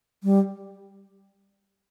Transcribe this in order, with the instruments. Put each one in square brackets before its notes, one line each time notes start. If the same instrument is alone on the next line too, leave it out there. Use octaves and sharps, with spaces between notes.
[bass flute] G3